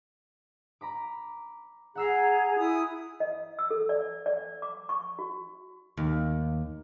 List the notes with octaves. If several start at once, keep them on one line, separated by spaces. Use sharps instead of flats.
A#5 B5 D6
G#4 F#5 A#5 E6 C7
E4 G#5 D#6
D#5
E6
A4
D5
D5
D6
C#6
F#4
D#2